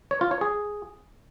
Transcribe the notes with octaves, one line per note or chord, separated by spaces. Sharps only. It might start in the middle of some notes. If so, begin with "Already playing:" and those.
C#5
F4
C#5
G#4